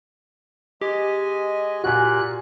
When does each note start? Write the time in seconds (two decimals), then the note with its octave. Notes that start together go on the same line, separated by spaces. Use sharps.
0.81 G#3 G4 D#5 G#5
1.84 A#2 F#4 G#5 F#6